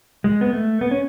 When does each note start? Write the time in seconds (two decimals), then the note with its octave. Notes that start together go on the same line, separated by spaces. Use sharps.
0.24 G#3
0.41 B3
0.53 A3
0.81 B3
0.91 C#4